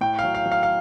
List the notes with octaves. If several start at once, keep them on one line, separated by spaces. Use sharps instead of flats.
A2 G5
F#3 F5
F5
F#3
F5
F5